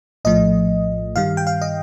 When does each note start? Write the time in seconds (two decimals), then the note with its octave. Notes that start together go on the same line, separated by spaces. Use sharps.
0.25 A#1 A2 F3 A3 D#5
1.16 G2 D#3 G3 F5
1.37 G5
1.47 F5
1.61 D#5